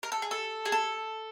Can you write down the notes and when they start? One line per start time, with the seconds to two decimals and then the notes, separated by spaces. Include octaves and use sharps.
0.03 A#4
0.12 A4
0.22 G#4
0.31 A4
0.65 G#4
0.72 A4